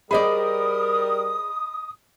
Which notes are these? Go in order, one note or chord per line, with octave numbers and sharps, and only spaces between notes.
G3 G#4 A#4 C5 D5 D#5 B5 D#6